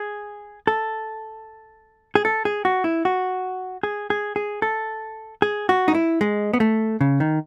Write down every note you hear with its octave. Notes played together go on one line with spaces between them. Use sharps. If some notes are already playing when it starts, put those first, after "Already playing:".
Already playing: G#4
A4
G#4
A4
G#4
F#4
E4
F#4
G#4
G#4
G#4
A4
G#4
F#4
D#4
E4
G#3
B3
A3
C#3
D#3